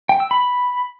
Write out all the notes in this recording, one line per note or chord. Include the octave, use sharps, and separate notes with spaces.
G5
E6
B5